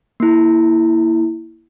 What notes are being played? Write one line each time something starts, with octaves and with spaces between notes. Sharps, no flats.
A#3 E4